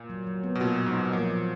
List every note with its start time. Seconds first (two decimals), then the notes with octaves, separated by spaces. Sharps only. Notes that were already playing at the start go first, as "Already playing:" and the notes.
Already playing: A#2
0.10 F#3
0.27 F#3
0.43 B3
0.55 B2
0.61 A#2 F#4
0.78 F#3
0.86 G#2
0.95 F#3
1.13 A#2 F3
1.30 F3